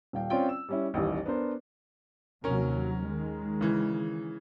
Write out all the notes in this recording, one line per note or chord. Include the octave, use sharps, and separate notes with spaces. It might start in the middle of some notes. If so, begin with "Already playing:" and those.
D#1 F5 G5
C4 C#4 F4 D5 G5
E6
G3 C#4 E4
A1 D#2 E3 G3
B3 D4 A#4 C5
D#2 C3 F#3 C#4 A#4
D#3 G#3
C#3 E3